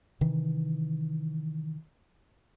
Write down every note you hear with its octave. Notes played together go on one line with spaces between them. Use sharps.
C3 D#3 E3